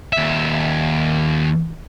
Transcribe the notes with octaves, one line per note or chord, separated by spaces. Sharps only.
D#2 E5